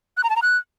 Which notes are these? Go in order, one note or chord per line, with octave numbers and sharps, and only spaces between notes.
F#6
A#5
A5
A#5
F#6